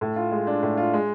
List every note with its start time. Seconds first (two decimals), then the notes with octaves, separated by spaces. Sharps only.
0.01 A2
0.16 F4
0.31 G#3
0.47 D4
0.62 A2
0.77 F4
0.94 G#3